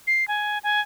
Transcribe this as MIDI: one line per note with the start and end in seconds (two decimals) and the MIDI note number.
0.07 0.27 96
0.28 0.58 80
0.63 0.80 80